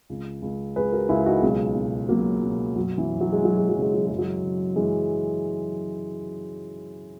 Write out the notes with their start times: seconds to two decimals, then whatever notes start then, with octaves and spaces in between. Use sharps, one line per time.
0.10 C#2
0.42 C#2
0.76 C#2 G#4 B4
0.92 F#4 A#4
1.09 C#2 E4 G#4
1.26 D#4 F#4
1.42 B1 G#3 B3
1.75 B2
2.09 B2 F#3 A#3
2.42 B2
2.76 F#2 F#3
2.98 E3
3.10 F#2
3.21 F#3
3.32 G#3
3.43 E3 F#3
3.57 G#3
3.69 F#3
3.76 C#3
3.82 G#3
3.94 F#3
4.06 F#2 G#3
4.18 F#3
4.43 C#3
4.76 F#2 E3 G#3